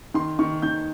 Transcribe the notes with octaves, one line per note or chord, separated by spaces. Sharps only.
D#3 C6
D#3 C#6
D#3 G6